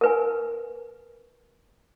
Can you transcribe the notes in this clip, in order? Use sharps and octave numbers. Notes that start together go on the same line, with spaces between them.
A#4 B4 G#5